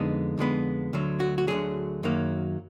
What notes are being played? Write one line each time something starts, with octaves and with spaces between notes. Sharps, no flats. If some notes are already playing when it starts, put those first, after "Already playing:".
Already playing: F2 D3 G#3 B3 D#4
F2 D3 G#3 B3
D2 D3 F#3
F#4
F#4
D2 D3 F#3 G#4
F#2 D#3 F#3 A#3